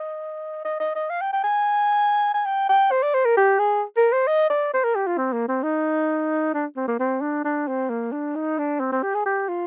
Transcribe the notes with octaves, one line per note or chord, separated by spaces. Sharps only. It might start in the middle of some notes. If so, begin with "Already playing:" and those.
Already playing: D#5
D#5
D#5
D#5
F5
G5
G5
G#5
G#5
G5
G5
C5
D5
C5
A#4
G4
G#4
A#4
C5
D#5
D5
C5
A#4
G4
F4
C4
A#3
C4
D#4
D4
C4
A#3
C4
D4
D4
C4
A#3
D4
D#4
D4
C4
C4
G4
G#4
G4
F4